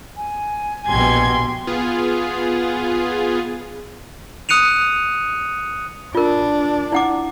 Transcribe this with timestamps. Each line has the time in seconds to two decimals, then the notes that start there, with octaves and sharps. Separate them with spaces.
0.17 G#5
0.87 A#1 B2 G4 C6 G#6
1.67 B3 F4 G#4
4.49 D#6 F#6 C#7 D#7 F7
6.15 D4 F4 A#4
6.92 E4 F#5 D6